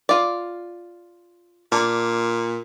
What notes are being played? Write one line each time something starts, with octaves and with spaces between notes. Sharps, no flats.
F4 D5
A#2 D4